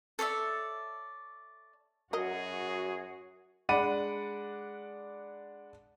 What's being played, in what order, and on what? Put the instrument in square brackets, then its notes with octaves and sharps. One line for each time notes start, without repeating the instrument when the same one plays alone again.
[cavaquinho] A4 C#5 D5 E5
[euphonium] F#2 [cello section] F#4 [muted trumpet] G#4 [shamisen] A#4 D#5
[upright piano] G#3 D4 D5 F#5 B5 D#7